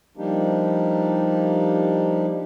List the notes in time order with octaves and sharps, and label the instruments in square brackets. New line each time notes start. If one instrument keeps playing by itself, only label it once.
[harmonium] F3 G3 A#3 D4 D#4 G4